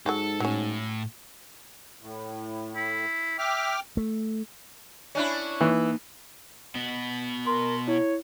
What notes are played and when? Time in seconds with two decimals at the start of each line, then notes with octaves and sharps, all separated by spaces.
0.06 G#2 F#3 F#4 G#4 A4
0.40 A2 F#3 C#4
2.01 A2
2.75 E4
3.38 E5 G5 D6 F6
3.97 A3
5.15 C#4 D4 E4
5.61 E3 A#3 D#4
6.75 B2 B3
7.47 A#4 C6
7.88 E4 C#5